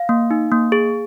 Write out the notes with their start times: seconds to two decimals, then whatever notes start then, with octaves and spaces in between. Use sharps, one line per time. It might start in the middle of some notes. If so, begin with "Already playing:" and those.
Already playing: F5
0.09 A#3
0.31 D#4
0.52 A#3
0.72 G#4